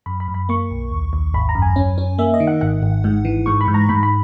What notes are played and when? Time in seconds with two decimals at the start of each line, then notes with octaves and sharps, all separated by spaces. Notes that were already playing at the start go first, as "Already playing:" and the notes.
0.06 F#2 B5
0.20 B5
0.28 F#2
0.34 B5
0.49 A#3 C#6
0.71 B1
0.92 D#2
1.13 D#2
1.34 G#1 B5
1.49 A#5
1.55 F#2
1.62 G#5
1.76 C#4
1.98 C#4
2.18 A#3 E5
2.34 D#5
2.40 D#3
2.47 F#5
2.61 G#1 F#5
2.83 G#1
3.04 G#2
3.25 E3
3.46 G#2 C#6
3.61 B5
3.68 G#2
3.74 A#5
3.89 G#2 B5
4.03 B5